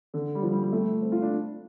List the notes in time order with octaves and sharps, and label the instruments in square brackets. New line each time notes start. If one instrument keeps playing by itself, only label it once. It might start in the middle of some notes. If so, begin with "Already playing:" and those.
[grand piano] D3
G3
F3
G3
G3
A3
C4
F4
D4